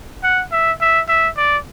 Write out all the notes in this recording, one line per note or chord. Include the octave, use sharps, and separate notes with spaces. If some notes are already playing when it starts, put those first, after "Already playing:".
F#5
E5
E5
E5
D5